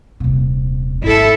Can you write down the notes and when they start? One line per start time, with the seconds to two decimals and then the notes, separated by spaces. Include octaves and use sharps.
0.20 D#1 C3
1.02 G#1 D3 E4 A4